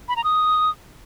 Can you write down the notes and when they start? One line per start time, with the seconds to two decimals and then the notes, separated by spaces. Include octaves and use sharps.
0.08 B5
0.16 A#5
0.24 D#6